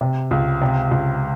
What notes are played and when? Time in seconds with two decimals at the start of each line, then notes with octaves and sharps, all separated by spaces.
0.01 C3
0.31 C#2
0.61 C3
0.91 C#2